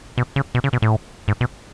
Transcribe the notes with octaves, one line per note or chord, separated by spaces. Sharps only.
B2
C#3
B2
C#3
B2
A2
G#2
B2